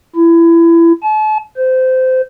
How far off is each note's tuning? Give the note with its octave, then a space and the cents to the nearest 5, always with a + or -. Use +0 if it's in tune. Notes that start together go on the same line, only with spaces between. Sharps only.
E4 +25
A5 -40
C5 -20